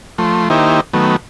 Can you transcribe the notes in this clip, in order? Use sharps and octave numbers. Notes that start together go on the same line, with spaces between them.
F3 A3 C6
D#3 A#3 D#4 E4 G4 C5
D#3 F#3 A3 B3